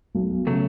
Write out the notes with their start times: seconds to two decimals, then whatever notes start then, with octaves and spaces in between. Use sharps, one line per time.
0.15 B1
0.47 C#3 F#3 A3